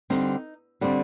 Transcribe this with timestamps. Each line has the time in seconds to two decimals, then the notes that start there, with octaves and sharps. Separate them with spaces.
0.10 D3 G3 C4 D#4
0.81 D3 G3 C4